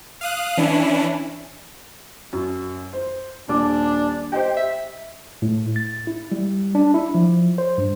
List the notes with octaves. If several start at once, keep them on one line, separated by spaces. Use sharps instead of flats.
F5 D#6 F#6
E3 C#4 D4 E4
F#2
C5
D#1 D4 D6
G4 C5 D#5 G5
E5
A2
A6
E4
G3
D4
E4
F3
C5
G2